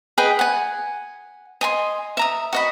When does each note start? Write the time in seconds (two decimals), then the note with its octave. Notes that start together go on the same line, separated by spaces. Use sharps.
0.18 G#4 B4 D#5 G5
0.39 F#5 G#5
1.61 D#5 G#5 C6
2.17 E5 A#5 D#6
2.53 F#4 D#5 B5